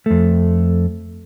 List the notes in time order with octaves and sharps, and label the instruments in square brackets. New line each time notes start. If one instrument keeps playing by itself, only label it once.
[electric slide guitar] F2 A3